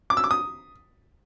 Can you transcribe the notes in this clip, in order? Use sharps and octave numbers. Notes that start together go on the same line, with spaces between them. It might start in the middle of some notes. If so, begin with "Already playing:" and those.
D6
E6
D6
D#6